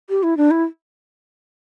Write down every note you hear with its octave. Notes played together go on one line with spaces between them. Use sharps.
G4
E4
D4
E4